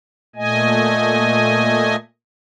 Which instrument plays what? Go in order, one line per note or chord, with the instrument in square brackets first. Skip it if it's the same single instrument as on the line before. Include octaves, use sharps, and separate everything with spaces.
[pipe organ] A#2 A3 D#5 G#5